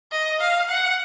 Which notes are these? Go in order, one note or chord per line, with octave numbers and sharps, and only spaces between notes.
D#5
F5
F#5